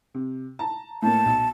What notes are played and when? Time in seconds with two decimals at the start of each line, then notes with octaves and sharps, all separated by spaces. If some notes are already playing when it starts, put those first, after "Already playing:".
0.14 C3
0.59 A5 A#5
1.02 A2 A#3 A5
1.26 B1